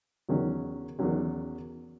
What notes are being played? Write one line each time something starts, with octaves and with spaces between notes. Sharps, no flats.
E2 D#3 F#3 C#4
E2 D#3 F#3 C#4